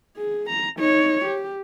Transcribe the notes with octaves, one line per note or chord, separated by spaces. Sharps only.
G#4
A#5
D#4 C#5
G4